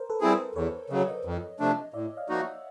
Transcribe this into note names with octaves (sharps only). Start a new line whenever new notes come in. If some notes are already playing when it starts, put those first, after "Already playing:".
Already playing: A#4 C5
A4 B4
G3 C4 E4 G#4
A#4 C5
E2 B4 C#5
C#3 F#3 D#5
D5
C#5 D#5
F2
C3 F3 A3 D4
A2 D5 E5
D#5 F5
F3 A#3 D#4 F#4
E5 F#5